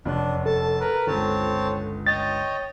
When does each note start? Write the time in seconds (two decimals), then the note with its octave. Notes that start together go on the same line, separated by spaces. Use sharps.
0.05 F1 E2 C#4 D4 F#6
0.46 A4 A5
0.80 A#4 B4
1.07 G1 C#2 C4 C#5 A5
2.07 C#5 D#5 G5 A6